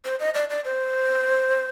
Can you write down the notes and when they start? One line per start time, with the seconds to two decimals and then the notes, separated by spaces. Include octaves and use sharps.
0.05 C5
0.20 D#5
0.34 D5
0.50 D5
0.65 C5